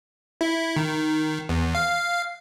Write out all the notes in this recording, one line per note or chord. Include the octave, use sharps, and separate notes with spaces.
E4
D#3
E2
F5